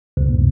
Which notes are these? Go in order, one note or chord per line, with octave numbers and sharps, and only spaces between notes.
C#2